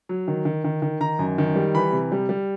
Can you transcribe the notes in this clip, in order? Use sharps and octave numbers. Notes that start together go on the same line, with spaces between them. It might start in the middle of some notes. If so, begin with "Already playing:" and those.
F#3
D#3
D#3
D#3
D#3
D#3 A#5
F#2
D#3
G3
E3 B5
C3
G3
G3